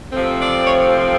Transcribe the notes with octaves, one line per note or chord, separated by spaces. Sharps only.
C3 F3 A3 C4
D5
C#5